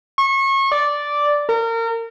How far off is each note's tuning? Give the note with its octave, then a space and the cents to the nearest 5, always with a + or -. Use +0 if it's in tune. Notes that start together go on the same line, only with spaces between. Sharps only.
C#6 -30
D5 -5
A#4 -30